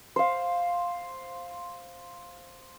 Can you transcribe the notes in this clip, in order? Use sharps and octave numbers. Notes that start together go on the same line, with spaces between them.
C5 F5